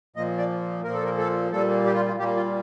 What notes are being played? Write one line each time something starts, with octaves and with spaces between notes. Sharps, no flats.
A#2 F3 A#3 D#5
D5
A#2 F3 A#3 A#4
A4
A#4
A4
A#2 G3 A#3 A4
G4
F4
F4
A#2 G3 A#3 G4
F4